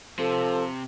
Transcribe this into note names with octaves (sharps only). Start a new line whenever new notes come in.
C3 F3 A4